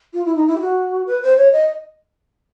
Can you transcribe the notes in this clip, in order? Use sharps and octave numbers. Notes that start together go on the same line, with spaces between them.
F4
E4
D#4
E4
G4
F#4
B4
C5
C#5
D#5